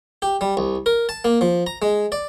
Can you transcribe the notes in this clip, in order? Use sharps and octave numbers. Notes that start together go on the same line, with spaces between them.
G4
G3
C2
A#4
A5
A#3
F3
A#5
G#3
D5